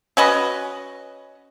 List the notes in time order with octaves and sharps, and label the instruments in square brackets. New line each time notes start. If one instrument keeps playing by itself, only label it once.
[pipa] C#4 F#4 B4 D#5